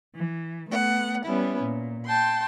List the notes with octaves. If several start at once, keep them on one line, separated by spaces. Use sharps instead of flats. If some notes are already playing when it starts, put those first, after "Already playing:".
E3
A3 B3 F#5
G3 B3 C#4 E4
A#2
G5 A5 C6